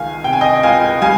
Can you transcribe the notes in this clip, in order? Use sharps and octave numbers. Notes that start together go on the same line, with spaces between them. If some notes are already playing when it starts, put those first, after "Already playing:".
Already playing: C#2 D#3 F5 G#5
C3 G5
G#5
D#5 G5
C#2 F5 G#5
G3 F5 G#5